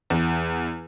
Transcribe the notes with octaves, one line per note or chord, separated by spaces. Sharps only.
E2